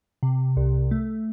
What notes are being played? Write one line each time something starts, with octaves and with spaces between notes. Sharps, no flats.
C3
C2
A3